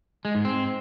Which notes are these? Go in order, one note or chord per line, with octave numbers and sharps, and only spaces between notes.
G#3
G#2
C4